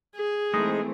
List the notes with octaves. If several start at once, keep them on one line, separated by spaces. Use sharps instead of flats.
G#4
E3 G#3 A3 C4 D#4